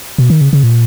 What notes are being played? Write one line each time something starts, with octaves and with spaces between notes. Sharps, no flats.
B2
D#3
C#3
C#3
A#2